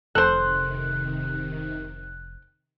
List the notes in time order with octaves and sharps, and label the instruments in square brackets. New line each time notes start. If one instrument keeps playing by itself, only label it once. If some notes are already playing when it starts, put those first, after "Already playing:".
[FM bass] F1 [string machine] C3 D#3 [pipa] A4 C5 [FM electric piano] F#6